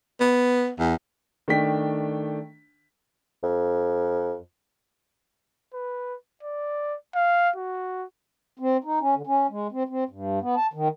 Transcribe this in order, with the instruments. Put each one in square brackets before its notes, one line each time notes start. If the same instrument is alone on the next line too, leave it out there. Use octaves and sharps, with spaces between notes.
[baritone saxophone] B3
E2
[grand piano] D#3 A3 D4 G5 B6
[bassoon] F2
[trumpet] B4
D5
F5
F#4
[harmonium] C4
D#4
C#4
D3
C#4
G#3
C4
C4
G2
B3
A5
D#3